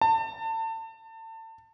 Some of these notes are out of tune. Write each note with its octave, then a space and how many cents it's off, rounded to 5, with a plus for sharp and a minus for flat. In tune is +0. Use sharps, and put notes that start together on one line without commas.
A5 +30